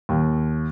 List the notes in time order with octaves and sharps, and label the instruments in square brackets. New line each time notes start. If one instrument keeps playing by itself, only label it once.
[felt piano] D#2